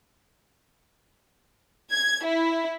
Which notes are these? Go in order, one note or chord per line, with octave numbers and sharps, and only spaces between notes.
G#6
E4